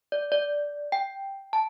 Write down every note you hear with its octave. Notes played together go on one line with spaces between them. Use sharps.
D5
D5
G5
A5